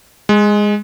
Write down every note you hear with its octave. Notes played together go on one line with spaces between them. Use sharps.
G#3